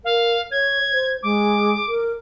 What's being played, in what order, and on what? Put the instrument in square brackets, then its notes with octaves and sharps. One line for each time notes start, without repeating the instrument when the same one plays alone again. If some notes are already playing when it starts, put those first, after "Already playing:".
[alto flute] A#4 [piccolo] F5
[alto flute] C#5 [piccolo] G#6
[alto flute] C5
[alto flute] G#3 [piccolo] D6
[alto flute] A#4